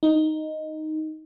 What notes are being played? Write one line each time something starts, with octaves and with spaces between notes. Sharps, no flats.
D#4